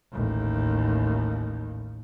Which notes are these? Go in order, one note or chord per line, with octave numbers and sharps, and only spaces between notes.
A1 D#2